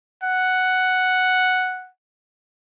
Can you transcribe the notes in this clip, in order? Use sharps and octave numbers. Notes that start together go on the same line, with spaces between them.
F#5